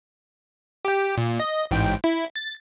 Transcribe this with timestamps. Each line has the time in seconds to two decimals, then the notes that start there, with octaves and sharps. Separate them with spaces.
0.85 G4 G5
1.17 A#2
1.40 D#5
1.71 A1 G#2 G5
2.04 E4
2.36 A6